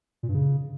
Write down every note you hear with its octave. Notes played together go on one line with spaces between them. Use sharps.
A#2
G2
C#3